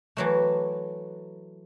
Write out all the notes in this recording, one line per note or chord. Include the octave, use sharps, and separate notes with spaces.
E3 F#3 A3